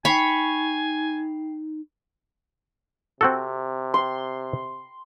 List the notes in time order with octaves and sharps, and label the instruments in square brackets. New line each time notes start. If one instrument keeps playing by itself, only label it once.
[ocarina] D#4 [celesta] G5 C7 F7 [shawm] G#5 [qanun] B5 C#6
[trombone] C3 [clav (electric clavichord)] C4 F#4 A4
[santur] C6